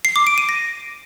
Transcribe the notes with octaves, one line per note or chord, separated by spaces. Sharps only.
C7
D6
D7
D#7
A#6